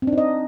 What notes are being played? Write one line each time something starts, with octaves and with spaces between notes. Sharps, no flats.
C4
D4
D#4
D#5